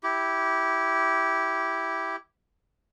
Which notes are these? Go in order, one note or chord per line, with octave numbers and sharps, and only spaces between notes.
E4 G4